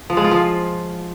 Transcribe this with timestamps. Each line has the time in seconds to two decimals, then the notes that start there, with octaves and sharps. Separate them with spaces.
0.10 F3
0.17 G#3
0.24 F4
0.31 F3